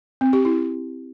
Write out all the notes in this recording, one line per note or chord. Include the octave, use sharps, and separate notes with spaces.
C4
G4
E4